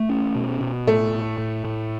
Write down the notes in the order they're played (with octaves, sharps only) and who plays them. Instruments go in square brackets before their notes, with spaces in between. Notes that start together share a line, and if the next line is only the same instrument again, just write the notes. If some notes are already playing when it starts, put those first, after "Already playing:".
Already playing: [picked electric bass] A3
C#4
B2
B2
[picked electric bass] A2 [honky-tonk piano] A3
[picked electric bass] A2
A2
A2